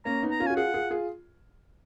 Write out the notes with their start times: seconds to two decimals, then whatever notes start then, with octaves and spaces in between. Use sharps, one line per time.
0.05 A#3 C#4 A#5
0.23 B3 D#4
0.31 A#5
0.40 C#4 F4
0.46 F#4 G#5
0.56 F4 G#4 F#5
0.74 F4 G#4
0.90 F4 G#4